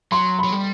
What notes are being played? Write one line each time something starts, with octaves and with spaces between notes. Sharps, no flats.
F#3 C6
F#3 B5
G3